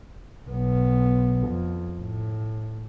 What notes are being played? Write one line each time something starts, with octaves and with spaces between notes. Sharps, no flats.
B1 B3
F2
A2